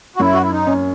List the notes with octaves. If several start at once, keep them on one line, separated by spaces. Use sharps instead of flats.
F#4
F#2 E4
F#4
E4
D#4
C#4